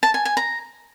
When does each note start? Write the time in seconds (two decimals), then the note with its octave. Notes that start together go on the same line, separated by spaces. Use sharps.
0.03 A5
0.14 G#5
0.25 G#5
0.37 A#5